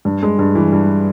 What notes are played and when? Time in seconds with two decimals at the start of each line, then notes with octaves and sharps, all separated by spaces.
0.05 G2
0.23 G#3
0.39 G2
0.55 E3
0.73 G2